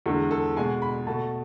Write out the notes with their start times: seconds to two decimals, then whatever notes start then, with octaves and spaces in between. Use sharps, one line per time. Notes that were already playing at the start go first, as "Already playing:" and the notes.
0.06 E2 D3 G#3 A4
0.31 A4
0.56 B2 G#3 G#5
0.82 B5
1.07 B2 A3 A5